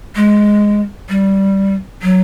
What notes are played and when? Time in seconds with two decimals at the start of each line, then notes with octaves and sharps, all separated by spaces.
0.16 G#3
1.09 G3
2.03 F#3